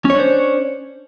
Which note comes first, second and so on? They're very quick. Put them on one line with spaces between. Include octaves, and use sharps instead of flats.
C#4 C#5 D4 C5